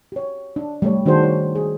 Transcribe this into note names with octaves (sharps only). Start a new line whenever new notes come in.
G4 C#5
D4
G3 A3 C#5
D#3 D4 F#4 G#4 C5
C#5
G#4